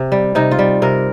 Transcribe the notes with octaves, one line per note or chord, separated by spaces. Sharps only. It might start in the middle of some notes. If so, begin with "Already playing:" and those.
Already playing: C3
G3
C3 D#4
F4
G3
C3 A#4